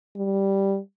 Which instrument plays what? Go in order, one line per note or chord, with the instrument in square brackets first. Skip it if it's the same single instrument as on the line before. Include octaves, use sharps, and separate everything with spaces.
[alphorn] G3